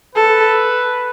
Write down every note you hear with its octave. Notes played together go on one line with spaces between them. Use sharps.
A4 B4